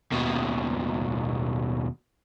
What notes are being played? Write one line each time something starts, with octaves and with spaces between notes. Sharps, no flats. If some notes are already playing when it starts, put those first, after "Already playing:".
D#2 B2